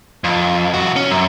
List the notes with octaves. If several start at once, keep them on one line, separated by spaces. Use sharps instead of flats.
F2
C2 F#4
C#4
F#2